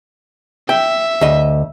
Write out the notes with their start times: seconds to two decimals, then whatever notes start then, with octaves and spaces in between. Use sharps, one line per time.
0.69 E5 G5
1.21 D2 D#5